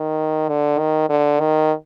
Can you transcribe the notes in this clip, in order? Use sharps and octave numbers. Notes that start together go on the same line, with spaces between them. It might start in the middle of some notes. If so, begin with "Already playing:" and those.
Already playing: D#3
D3
D#3
D3
D#3